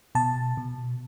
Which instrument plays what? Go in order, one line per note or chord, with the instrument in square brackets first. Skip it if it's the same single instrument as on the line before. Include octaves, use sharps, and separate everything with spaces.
[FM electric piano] B2 A5
B2